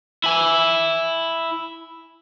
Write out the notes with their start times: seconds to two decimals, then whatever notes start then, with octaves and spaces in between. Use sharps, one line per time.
0.24 E4 G#5